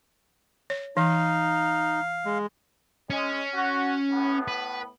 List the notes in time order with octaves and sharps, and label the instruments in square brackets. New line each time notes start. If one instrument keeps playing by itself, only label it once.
[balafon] C#5
[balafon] E3 [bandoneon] D#4 [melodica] F5
[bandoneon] G#3
[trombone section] G#3 [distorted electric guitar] C#4
[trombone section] F#4
A2 B3
[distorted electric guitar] B4